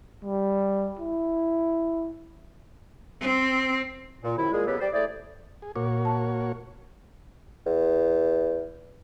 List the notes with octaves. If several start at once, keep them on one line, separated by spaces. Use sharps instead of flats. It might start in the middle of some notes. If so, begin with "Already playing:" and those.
G3
E4
C4
A#2
F#2 C3 D#3 E4
A#2 G#3 G#4
C#3 F#3 B3 G4 A4 B4
G3 G4 C5 D5
A3 E4 G#4 C5 D5
G#4
A#2 A#3 F#4 C#5
A5
E2